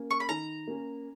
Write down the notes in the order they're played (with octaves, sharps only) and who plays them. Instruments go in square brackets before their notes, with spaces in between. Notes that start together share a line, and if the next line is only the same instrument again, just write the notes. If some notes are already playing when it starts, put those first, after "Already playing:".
Already playing: [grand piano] A#3 C#4
[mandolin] C#6
B5
[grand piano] D#3 [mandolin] A#5
[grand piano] A#3 C#4